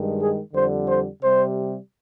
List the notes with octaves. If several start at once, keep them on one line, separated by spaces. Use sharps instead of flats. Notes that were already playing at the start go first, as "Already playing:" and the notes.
Already playing: G2 D#3 G#3
G#4
F2 D3 G3 C5
C5
C3 G3 C5